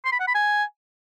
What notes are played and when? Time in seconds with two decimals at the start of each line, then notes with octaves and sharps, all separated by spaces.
0.05 C6
0.12 B5
0.20 F#5
0.27 B5
0.35 G#5